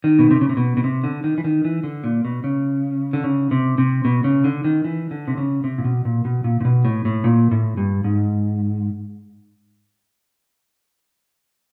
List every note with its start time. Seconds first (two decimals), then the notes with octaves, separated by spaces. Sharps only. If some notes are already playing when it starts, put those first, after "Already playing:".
0.04 D#3
0.19 B2
0.31 C3
0.41 C#3
0.49 C3
0.57 B2
0.77 B2
0.84 C3
1.04 D3
1.24 D#3
1.38 E3
1.44 D#3
1.65 E3
1.84 D3
2.04 A#2
2.25 B2
2.44 C#3
3.13 D3
3.24 C#3
3.51 C3
3.78 C3
4.05 B2
4.24 C#3
4.44 D3
4.64 D#3
4.84 E3
5.11 D3
5.28 C3
5.38 C#3
5.64 C3
5.78 A#2
5.84 B2
6.05 A#2
6.25 B2
6.44 A#2
6.61 A#2
6.65 B2
6.85 A2
7.05 A2
7.24 A#2
7.51 A2
7.77 G2
8.04 G#2